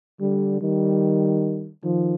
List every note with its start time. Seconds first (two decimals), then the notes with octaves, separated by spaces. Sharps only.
0.21 D3 G3
0.61 D#3 G3
1.84 D#3 F3